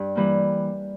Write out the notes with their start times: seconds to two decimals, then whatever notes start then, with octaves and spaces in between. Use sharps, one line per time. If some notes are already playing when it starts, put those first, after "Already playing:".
Already playing: G2
0.15 E3 G3 A#3